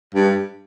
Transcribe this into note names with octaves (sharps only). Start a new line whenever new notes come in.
G2